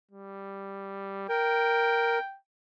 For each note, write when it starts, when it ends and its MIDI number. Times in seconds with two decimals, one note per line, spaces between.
0.11 1.24 55
1.29 2.18 70
1.29 2.36 79